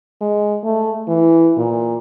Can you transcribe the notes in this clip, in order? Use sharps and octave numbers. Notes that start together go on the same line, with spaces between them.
G#3
A3
E3
A#2